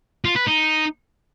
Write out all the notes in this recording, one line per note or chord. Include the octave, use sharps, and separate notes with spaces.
F4
B4
D#4